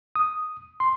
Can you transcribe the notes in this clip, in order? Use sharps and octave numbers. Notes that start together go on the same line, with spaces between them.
D#6
C6